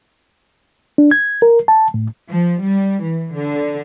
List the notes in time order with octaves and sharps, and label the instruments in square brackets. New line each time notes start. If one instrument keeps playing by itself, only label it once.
[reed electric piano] D4
G#6
A#4
A5
A2
[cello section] F3
G3
E3
D3